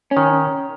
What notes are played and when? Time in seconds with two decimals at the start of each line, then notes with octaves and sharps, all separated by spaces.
0.11 C#4
0.17 D#3